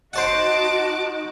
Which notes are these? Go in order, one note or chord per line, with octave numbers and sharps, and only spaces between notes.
D#4 F#4 C5 D5 D#5 F#5 A5 D6